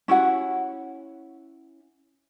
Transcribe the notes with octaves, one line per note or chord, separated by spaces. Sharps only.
C#4 E4 F#4 F#5